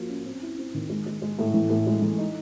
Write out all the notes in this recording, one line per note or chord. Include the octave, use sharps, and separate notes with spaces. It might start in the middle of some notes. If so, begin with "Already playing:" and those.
Already playing: F3 A#3 F#4
C#4
C4
E4
C4
D#3
G#3
G#3
G#3
A2
E3
A2
G#3
E3
D#4